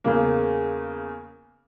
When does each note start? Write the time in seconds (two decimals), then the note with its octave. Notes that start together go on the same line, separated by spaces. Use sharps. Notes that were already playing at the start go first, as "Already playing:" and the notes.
0.04 E2 C#3 A#3